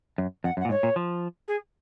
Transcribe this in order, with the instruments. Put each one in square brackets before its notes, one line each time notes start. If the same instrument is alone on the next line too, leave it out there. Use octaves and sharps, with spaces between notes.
[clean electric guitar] F#2
[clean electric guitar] F2 [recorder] F#5
[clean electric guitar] F#2
[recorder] F#5
[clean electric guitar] A#2
[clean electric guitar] G#2 [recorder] C#5
[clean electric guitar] A#2
F3
[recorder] G#4